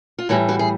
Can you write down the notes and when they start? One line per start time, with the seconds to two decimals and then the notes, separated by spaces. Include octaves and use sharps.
0.19 F4
0.29 A2 E3 G3 E4 F#4
0.49 E4 F#4
0.59 G#4